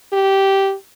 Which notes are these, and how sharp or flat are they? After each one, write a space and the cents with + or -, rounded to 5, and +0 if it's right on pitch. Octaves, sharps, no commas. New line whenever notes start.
G4 -10